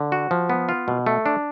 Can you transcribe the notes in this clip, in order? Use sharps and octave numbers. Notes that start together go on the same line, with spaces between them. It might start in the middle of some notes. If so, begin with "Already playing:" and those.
Already playing: D3
F#4
F3
B3
F4
B2
A3
D4